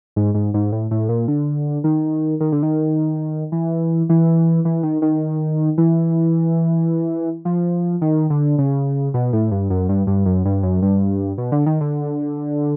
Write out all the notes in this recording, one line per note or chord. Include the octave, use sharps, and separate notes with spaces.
G#2
G#2
G#2
A2
A2
A#2
D3
D#3
D#3
D3
D#3
E3
E3
E3
D#3
D#3
E3
F3
D#3
D3
C#3
B2
A2
G2
F#2
G2
G2
F#2
G2
F#2
G2
B2
D3
D#3
D3